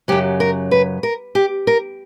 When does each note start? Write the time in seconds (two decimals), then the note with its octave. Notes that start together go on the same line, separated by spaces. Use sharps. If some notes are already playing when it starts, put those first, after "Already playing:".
0.08 F#2 C#3 F#3 G4
0.40 A#4
0.71 B4
1.03 A#4
1.35 G4
1.67 A#4